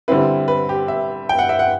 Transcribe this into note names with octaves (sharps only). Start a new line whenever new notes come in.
D3 G3 C4 E4 B4
B4
G4
E5
G5
F#5
E5
F#5